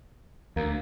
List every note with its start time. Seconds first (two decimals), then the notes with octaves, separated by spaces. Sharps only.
0.56 D2 A#3